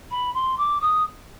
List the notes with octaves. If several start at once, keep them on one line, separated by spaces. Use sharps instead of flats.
B5
C6
D6
D#6